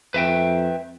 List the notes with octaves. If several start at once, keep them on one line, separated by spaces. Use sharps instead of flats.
F2 B4 E5 G5